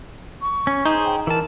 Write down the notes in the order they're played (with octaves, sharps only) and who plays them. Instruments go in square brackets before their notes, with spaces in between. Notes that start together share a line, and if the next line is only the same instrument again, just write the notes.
[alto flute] C#6
[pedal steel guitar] C#4
[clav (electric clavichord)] D#4 [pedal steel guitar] G#4 C5
[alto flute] G5
[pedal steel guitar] E3 A5 [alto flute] A#4